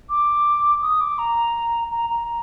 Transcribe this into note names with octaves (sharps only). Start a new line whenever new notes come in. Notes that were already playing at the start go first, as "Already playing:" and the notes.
D6
D#6
D6
A#5
A#5
A#5